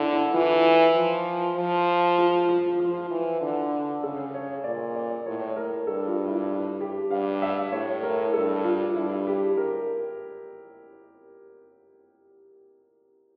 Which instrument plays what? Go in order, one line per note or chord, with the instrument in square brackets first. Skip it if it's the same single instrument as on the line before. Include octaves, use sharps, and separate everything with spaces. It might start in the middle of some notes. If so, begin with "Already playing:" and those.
Already playing: [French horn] D3 [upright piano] E4
[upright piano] E4
[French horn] E3 [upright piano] F4
[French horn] F3
F3
[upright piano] F4
F4
[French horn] F3 [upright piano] F4
[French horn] E3
D3
[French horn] C#3 [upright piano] A4
[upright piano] C#5
[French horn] A#2 [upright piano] D5
[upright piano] D5
[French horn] A2 [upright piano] C#5
[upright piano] A#4
[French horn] G2 [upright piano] A4
[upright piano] F4
E4
G4
[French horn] G2 [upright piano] F5
[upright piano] E5
[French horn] A2 [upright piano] C#5
[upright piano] A#4
[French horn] G2 [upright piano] A4
[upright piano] F4
[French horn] G2 [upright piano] E4
[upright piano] G4
A#4